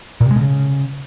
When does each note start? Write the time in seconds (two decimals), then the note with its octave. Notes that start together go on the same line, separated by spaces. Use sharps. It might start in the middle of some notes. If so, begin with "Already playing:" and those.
0.21 A#2
0.26 C3
0.31 G#3
0.36 B2
0.41 C#3